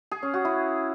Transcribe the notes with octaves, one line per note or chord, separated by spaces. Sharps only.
G#4
C#4
F#4
E4